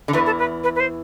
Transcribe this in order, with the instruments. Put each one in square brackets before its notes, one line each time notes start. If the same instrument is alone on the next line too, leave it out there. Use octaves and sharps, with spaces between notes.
[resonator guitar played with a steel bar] D3
[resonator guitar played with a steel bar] E2 E3 [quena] B4
[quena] A4
B4
B4
B4
C5